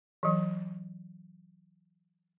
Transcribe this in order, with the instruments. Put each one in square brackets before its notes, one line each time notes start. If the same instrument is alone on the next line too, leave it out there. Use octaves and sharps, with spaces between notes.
[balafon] E3 F#3